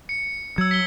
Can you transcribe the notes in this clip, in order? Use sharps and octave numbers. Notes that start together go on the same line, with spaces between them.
C#7
F#3 E6 G#6
B6 G7